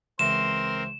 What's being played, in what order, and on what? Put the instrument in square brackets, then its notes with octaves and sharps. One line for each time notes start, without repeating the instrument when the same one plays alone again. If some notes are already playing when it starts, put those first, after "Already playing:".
[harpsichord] C#2 E3 [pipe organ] C4 A#4 [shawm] C6 [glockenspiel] E7